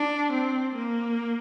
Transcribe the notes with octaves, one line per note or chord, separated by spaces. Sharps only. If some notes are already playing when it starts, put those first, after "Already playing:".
Already playing: D4
C4
A#3